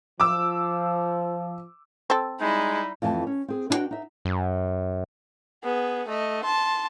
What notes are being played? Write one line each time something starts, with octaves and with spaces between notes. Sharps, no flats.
F3 D6 E6
C4 A4
G3 G#3 D#4 E4
F2 E3 A3 G5 A5
C#4
C4 G#4
D4 E4 F#4 B4 D#5 G5
D#4 E5
F#2
B3 G#4
A3 D#5
A5 C6